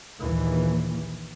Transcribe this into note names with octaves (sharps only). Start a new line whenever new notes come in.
A#1 D#2 E3